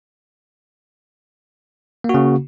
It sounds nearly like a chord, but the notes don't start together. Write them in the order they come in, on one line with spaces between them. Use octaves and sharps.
A#3 F#4 C#3